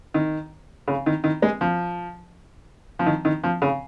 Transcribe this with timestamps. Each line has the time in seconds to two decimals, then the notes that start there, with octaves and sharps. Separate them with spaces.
0.14 D#3
0.88 C#3
1.06 D#3
1.24 D#3
1.42 G#3
1.61 F3
2.99 F3
3.06 D#3
3.25 D#3
3.44 F3
3.62 C#3